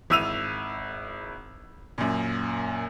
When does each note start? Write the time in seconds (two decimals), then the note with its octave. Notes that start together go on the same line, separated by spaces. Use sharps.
0.10 G#1 E4 E6 D#7 F7
1.98 F#2 A#2